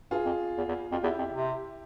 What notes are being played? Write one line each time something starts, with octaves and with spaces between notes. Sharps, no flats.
G2 F4 G#4
F2
E2
E2
F2 F4
E2 E4 G4
F2
C3